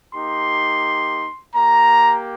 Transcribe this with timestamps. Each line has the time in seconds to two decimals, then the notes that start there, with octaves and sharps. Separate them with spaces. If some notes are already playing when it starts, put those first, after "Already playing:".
0.13 A#3 D#4 G4 C6
1.55 A#3 G4 A#5